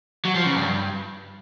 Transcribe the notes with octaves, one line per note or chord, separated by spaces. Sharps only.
F#3
F3
C#3
G2